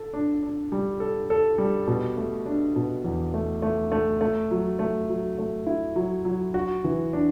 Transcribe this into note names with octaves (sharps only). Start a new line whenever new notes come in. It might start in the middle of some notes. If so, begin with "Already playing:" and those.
Already playing: A4
D4
D4
G3
A4
A4
G3
B2
A3
D4
B2
E2
A3
A3
A3
A3
F#3
A3
F#3
A3
E4
F#3
F#3
F#4
E3
D4